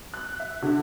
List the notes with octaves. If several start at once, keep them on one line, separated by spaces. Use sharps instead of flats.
F#6
E5
D3